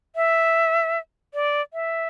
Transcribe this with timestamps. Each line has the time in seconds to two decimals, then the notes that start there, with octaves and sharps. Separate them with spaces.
0.16 E5
1.34 D5
1.73 E5